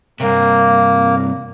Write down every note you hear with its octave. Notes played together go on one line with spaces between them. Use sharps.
G2 C3 A#3